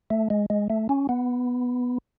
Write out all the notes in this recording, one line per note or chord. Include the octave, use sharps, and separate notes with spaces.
A3
G#3
G#3
A3
C#4
B3